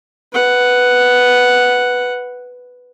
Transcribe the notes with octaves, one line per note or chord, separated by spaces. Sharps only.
B4 F#5